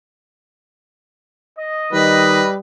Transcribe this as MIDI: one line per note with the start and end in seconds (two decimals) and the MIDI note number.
1.57 2.55 75
1.93 2.43 51
1.93 2.58 55
1.93 2.52 71